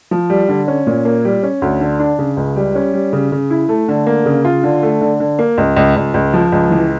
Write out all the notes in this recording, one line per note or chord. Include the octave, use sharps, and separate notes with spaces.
F3
G3
D3
C#4
A#2
A#3
G3
C#4
D2
D3
D4
C#3
C#2
G3
C#4
G3
C#3
C#3
E4
A3
D3
A#3
C#3
F4
D3
A3
D3
D3
A#3
C#2
C#2
C#2
C#2
F3
C#2
E3